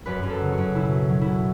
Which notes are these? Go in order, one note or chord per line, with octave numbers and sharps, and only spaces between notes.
F#2 B4
F#2
A4
C#3
F#4
F#2
B2 E4
B2
F#3
B2 E4